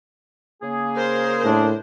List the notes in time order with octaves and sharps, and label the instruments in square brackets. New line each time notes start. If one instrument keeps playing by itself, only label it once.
[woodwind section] C#3 A#3 G#4
[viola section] A#4 C5
[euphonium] A2 [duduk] D4